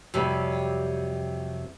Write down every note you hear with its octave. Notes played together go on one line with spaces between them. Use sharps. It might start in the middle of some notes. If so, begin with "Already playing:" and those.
F2 C3 F#3 G3